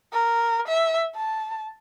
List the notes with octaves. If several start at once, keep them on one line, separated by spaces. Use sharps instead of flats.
A#4
E5
A5